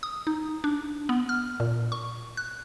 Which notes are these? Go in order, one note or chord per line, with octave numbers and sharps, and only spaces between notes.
D#6
D#4
D4
B3
F6
A#2
C#6
F#6